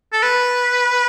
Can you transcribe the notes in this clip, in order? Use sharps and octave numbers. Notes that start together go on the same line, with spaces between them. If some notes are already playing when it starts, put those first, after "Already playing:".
A4
B4